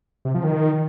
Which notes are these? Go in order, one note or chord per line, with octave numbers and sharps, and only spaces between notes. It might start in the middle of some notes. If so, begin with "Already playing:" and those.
C3
F3
D#3